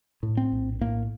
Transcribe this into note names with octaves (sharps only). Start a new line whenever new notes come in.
A2
C4
A#1
A2 A#3